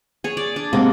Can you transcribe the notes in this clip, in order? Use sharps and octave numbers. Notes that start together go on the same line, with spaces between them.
G#4 C#5
D5
D4
C3 G#3 A#3 C4 F#5